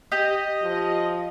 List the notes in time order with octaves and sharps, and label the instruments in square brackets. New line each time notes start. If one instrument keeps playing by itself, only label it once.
[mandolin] G4 [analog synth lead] D#5
[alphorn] F3